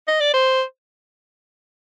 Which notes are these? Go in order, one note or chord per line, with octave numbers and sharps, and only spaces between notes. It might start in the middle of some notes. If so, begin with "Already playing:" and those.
D#5
D5
C5